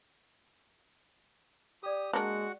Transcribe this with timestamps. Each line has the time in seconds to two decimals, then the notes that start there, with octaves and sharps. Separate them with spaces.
1.83 G4 A4 D5 D#6
2.13 G#3 A#3 D4 F#4 F#5 C#6